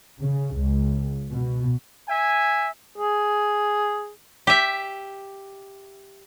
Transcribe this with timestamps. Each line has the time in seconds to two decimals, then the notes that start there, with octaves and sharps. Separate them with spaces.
0.20 C#3
0.58 C#2
1.32 B2
2.07 E5 G#5
2.98 G#4
4.47 G4 E5